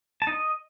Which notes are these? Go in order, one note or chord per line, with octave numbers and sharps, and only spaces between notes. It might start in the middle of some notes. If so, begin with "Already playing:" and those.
A5
D#4
D#5